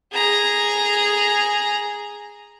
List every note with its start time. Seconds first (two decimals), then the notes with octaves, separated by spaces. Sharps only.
0.12 G#4 A#5